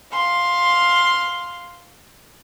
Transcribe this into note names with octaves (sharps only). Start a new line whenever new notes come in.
F5 C6